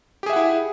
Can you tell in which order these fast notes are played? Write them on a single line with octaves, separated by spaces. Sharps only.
G4 G#4 E5 F#5 E4